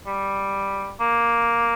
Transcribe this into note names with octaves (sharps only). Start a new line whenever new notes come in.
G3
A#3